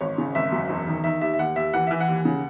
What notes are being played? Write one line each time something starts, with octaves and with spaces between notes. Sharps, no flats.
G#1 C#5
C#3
G#1 E5
F#2
E1
D#3
D#3 E5
D#2 E5
E5
D#2 F#5
D#2 E5
E3 F#5
E3 E5
F#5
D#2
C#3